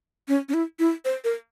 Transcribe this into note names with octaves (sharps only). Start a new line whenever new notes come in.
C#4
C#4
E4
E4
C5
A#4